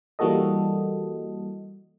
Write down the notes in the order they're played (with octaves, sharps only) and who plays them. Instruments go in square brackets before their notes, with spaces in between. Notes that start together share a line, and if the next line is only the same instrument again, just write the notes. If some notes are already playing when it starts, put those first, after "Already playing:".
[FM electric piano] E3 G3 A#3 F#4 A4 D#5